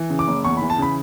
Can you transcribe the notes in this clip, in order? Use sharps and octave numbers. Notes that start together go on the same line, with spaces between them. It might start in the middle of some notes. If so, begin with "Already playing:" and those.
Already playing: E3
C#3
D6
F#1
E2 C#6
B5
E3
A5
C#3 B5